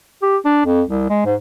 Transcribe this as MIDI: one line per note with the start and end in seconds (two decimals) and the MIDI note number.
0.22 0.37 67
0.45 0.62 62
0.66 0.82 41
0.88 1.08 36
1.10 1.23 56
1.26 1.35 44